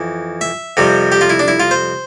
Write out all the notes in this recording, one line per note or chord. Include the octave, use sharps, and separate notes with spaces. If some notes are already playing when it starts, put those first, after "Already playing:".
Already playing: F2 E3
E5
F2 C3 G3
G4
F4
E4
D4
E4
F4
C5